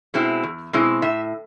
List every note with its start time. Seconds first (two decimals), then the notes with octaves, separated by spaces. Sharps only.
0.14 B2 G#3 C4 E4
0.43 E2
0.73 B2 G#3 C4 E4
1.02 A2 E5